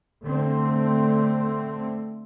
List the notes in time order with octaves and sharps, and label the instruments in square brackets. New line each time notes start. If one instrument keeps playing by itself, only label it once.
[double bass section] D3 A3 C4